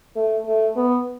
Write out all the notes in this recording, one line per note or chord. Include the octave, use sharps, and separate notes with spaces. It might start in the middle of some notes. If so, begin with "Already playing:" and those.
A3
A3
B3